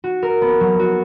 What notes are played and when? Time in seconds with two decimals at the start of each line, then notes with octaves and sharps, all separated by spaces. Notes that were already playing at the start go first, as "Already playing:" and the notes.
0.04 F#4
0.23 A#4
0.42 B3
0.60 F#3
0.79 F#4